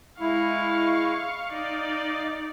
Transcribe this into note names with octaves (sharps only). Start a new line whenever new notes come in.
G#3 E4 F5 C#6
D#4 D5 D#5 F5